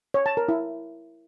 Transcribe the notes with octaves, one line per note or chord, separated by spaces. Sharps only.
C#5
A5
A#4
E4